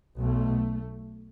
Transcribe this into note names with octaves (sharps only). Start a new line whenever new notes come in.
B1 B2 A3